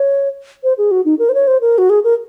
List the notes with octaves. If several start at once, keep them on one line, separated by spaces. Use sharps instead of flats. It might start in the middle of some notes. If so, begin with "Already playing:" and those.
Already playing: C#5
C5
G#4
F#4
D#4
A#4
C5
C#5
C5
A#4
F#4
G#4
A#4